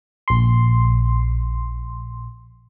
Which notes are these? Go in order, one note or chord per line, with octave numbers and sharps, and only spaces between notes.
A#1 C6